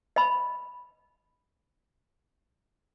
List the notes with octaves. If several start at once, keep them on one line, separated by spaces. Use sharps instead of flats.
D#5 B5